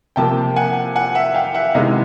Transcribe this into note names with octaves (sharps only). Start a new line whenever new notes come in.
C3 F3 A#3 G5 A5
F#5 G#5
F#5 G#5
E5 F#5
F5 G5
E5 F#5
C3 D#3 G#3 B3 E4 D#5 F5